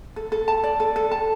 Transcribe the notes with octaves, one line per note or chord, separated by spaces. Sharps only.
A4
A4
A5
D5
A4
A4
A5